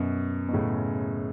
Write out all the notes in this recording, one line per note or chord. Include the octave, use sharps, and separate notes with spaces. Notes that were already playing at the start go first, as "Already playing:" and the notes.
Already playing: F#2 B2
B2
A2 C#3